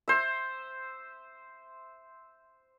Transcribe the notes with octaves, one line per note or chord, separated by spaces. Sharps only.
C5 E5